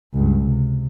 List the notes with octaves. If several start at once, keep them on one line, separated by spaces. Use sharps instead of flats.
C#2 G2
C3